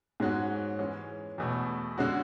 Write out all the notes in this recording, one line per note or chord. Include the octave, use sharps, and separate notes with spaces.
G#2 G#3 C#4 F#4
E3 G#3 C#4
E2 B2 A3
D3 G#3 C#4 F#4